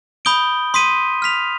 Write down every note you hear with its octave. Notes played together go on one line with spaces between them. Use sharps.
B5 D#6 G6 D7 G7
C6 D#6 B6 D#7
F6 B6 F7